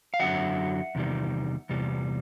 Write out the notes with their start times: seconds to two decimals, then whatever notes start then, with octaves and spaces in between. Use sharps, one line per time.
0.14 F5
0.20 F#2 D3 F#3 E5 F#5
0.95 E2 C3 D#3 G3
1.69 E2 C3 G3